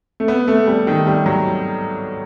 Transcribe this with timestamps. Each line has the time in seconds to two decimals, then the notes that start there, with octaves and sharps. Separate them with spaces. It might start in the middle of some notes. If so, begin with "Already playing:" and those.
0.20 A3
0.28 B3
0.47 A3
0.67 G3
0.87 D#3
1.07 G3
1.26 F#3